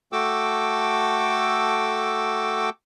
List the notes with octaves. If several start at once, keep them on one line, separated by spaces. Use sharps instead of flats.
A3 F#4 A4 G5 D6 E6